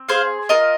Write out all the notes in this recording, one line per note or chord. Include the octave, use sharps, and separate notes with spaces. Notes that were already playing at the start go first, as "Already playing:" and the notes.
Already playing: C4
G#4 C5 F5
F4 A#4 D#5